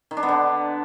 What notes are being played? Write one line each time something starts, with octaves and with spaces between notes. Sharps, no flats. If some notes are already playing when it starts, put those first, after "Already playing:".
D#3
D4
B3
D3